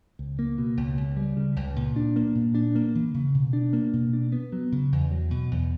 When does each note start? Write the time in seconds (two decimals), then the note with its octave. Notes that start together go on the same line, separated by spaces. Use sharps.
0.19 C#2
0.39 A#3
0.58 B2
0.77 C#2
0.98 C#2
1.17 G3
1.37 C#3
1.56 C#2
1.76 A#2
1.96 D4
2.16 A#3
2.35 A#2
2.55 D4
2.75 A#3
2.95 E3
3.14 C#3
3.34 B2
3.53 D4
3.73 A#3
3.93 B2
4.13 D4
4.32 B3
4.52 F#3
4.72 C#3
4.92 E2
5.11 F#3
5.31 B2
5.51 E2